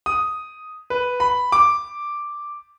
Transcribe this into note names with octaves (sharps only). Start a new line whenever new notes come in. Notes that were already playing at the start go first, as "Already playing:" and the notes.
D#6
B4
B5
D6